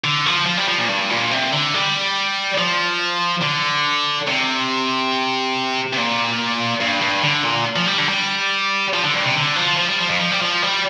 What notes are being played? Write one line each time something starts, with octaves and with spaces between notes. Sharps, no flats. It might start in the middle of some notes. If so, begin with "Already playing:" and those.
D3
F3
F3
G3
F3
A#2
G2
A#2
C3
D3
G3
F3
D3
C3
C3
A#2
G2
G2
D3
A#2
F3
G3
D3
G3
F3
D3
G2
C3
D3
F3
F3
G3
F3
F2
F3
G3
F3
G3